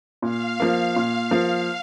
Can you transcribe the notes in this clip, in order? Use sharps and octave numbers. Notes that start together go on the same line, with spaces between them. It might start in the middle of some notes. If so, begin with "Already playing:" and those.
A#2 F5
F3 A#3
A#2
F3 A#3